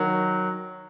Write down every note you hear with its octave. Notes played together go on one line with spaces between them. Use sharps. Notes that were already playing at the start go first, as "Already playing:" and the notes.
Already playing: D#3 F#3